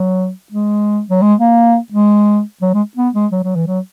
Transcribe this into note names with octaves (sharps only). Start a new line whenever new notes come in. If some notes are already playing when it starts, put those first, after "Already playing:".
Already playing: F#3
G#3
F#3
G#3
A#3
G#3
F#3
G#3
B3
G#3
F#3
F#3
E3
F#3